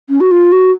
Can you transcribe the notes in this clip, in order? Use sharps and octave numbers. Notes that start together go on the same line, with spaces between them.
C#4
F#4
F4
F#4